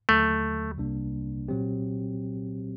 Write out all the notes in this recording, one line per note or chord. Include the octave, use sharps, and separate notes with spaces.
D#2 D3 F#3 A3
C2 C3 G3 A#3 D4
A#2 F#3 C4 G4